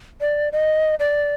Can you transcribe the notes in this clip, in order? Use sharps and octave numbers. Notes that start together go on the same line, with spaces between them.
D5
D#5
D5